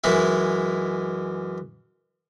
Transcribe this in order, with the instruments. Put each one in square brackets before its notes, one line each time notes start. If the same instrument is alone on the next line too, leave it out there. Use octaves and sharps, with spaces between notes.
[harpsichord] F#2 E3 G#3 D#4 E4